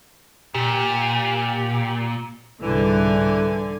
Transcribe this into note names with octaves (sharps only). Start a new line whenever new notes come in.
A#2 G4
C2 G#2 D3 E3 G#5